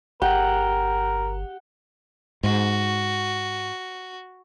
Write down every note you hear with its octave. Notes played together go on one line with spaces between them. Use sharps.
G1 G4 A#4 F#5
G#2 F#4